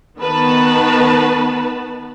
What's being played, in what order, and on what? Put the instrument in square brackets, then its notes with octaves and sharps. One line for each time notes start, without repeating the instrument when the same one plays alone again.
[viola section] D#3 B3 B4 A5